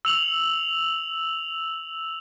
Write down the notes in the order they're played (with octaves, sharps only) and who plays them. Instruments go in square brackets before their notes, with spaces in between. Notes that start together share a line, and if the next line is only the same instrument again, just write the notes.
[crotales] E6 F7 F#7